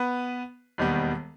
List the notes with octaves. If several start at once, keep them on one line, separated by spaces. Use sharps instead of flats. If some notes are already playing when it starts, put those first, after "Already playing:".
Already playing: B3 B4
E1 D#2 D#3 G3 B3